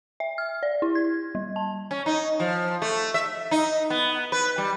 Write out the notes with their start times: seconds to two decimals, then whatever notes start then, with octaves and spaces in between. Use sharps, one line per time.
0.20 E5
0.38 F6
0.63 D5
0.82 E4
0.95 G#6
1.35 G3
1.56 A5
1.91 C#4
2.06 D#4
2.40 F3
2.82 A3
3.14 E5
3.51 D#4
3.90 B3
4.32 B4
4.58 G3